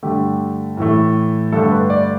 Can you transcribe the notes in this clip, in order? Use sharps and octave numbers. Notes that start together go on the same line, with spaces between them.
G2 D3 A3 G4
A2 E3 A3
G2 D3 A3 A4
B4
D5